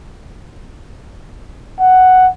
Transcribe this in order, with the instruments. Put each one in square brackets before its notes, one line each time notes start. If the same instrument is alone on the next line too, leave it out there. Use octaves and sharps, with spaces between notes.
[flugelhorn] F#5